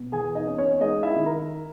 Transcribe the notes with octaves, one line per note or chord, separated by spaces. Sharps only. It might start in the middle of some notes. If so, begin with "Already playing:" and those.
Already playing: B2
E2 G#4 G#5
D#4 D#5
C#4
C#4 C#5
G#3 D#4 D#5
E4 E5
D#3
A#4 A#5